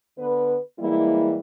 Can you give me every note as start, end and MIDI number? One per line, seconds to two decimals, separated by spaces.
0.18 0.56 50
0.18 0.56 59
0.18 0.56 71
0.79 1.38 52
0.79 1.38 55
0.79 1.38 56
0.79 1.38 58
0.79 1.38 64